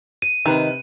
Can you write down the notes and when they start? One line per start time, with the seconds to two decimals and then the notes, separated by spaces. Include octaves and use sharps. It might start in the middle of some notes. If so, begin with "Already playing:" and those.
0.22 D#7
0.46 C3 D#3 B4